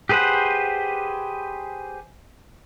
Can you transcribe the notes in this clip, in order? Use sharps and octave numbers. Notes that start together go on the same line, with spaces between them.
G4 G#4 B4 C5 F#5